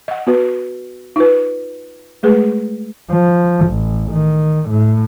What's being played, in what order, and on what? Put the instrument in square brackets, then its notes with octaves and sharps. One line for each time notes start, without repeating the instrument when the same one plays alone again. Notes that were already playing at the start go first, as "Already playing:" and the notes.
[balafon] D#5 F#5
B3 F#4 B4
D#4 F4 B4
G#3 A3 G#4 B4
[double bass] F3
A1
D#3
A2